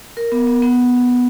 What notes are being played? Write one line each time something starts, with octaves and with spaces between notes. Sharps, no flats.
A#4
B3
B3
B3